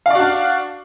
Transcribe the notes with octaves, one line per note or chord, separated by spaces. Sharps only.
D4 F#4 D5 F5